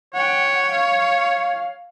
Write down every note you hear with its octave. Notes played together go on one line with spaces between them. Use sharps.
C#5 F#5 G5
F5